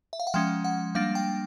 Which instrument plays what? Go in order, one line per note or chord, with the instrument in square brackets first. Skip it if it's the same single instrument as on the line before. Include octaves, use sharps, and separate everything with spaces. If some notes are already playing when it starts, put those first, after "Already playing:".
[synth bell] E5
F5
F#5
F3 G#3 C#4 G5
F#5
G3 A#3 D4 F5
G5